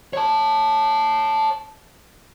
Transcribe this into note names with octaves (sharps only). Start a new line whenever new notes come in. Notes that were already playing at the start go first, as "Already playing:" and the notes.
C#5 A5